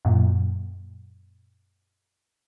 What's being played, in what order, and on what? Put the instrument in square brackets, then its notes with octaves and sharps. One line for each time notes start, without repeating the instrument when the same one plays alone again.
[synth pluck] F#2 A#2